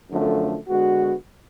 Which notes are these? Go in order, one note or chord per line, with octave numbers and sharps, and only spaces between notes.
F#2 D3 F3 A3
D3 G#3 B3 F#4